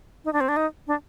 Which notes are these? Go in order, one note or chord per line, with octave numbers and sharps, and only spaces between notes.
D#4
D4
C4
D4
D#4
D4